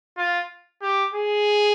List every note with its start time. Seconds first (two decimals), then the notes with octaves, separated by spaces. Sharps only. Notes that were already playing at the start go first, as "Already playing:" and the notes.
0.18 F4
0.82 G4
1.14 G#4